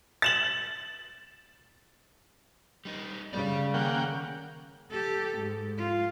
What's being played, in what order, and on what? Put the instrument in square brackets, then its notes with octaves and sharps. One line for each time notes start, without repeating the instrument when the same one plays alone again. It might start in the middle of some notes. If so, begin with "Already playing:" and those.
[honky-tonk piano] A6 E7 F#7
[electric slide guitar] G3 D#4 A#4
[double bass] C#3 [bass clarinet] G3 [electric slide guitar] G4 D5
[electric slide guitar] D#3 [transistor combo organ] A#3 F#5 G5 [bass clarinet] C#4
[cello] G4 A4
G#2
F4